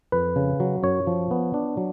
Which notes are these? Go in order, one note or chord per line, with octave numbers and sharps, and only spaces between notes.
F2 B4
C#3
F#3
F#2 C#5
F3
B3
D4
F#3